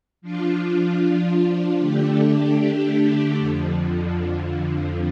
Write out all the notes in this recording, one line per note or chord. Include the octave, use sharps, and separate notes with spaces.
F3 D4 F4
D3 A3 D4 G4
F2 D3 F3